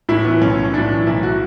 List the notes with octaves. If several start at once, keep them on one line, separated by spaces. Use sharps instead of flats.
A2 E3 E4
B3
B1 C#4
A2 E3 D4
B1 E4
F#4